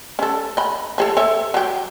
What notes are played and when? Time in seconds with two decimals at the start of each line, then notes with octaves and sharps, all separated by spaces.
0.19 C#4 A4
0.57 D#5 B5
0.98 F3 G#4 A4
1.17 A4 C#5 E5
1.54 F#3 G4